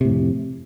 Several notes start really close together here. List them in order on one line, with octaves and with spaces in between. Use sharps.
C3 A2 F2